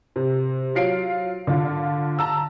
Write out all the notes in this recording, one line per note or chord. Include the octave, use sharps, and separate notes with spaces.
C3
F#3 F4 C7 D7
D3 F4
A5 A#5 E6